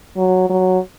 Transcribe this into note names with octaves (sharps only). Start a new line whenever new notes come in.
F#3
F#3